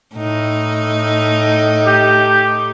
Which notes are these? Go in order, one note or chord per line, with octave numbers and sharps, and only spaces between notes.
A2 D#4
G4